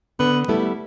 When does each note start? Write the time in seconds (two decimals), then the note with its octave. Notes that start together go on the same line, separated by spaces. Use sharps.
0.20 D3 B3
0.48 G3 A3 B3 E4 A4